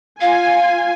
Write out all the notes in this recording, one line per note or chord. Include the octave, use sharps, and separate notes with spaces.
F4 F5 G#5